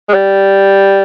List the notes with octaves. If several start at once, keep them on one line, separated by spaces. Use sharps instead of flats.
G#3
G3